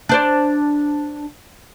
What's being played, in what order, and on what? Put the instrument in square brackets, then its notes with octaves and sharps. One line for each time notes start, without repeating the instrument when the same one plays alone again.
[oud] D4 C5 D5